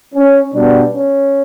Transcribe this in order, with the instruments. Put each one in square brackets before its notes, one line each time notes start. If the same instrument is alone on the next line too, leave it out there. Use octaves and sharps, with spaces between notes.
[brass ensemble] C#4
B2 G3 B3 D4
C#4